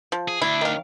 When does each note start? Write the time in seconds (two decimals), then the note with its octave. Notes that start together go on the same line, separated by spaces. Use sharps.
0.12 F3
0.28 G#4
0.41 D2 D4 E4
0.61 D#3 F5